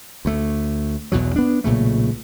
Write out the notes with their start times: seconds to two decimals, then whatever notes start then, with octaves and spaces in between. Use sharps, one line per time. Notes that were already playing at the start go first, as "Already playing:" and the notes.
0.25 D2 A3
1.12 B1 E2 B2 F#3
1.36 B3 D4
1.64 B1 A#2 C#3 A3